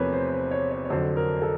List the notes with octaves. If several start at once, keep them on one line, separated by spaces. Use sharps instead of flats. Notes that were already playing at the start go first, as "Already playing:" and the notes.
Already playing: E2 C3 F3 A3 A#4 B4 C#5
C5
C5
C#5
C#5
C#5
F2 D3 F#3 C5
A#4
A4